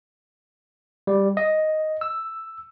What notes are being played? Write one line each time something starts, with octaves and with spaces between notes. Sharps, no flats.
G3
D#5
E6